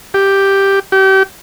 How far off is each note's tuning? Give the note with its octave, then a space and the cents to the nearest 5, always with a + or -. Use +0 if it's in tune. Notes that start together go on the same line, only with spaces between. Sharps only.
G4 +0
G4 -35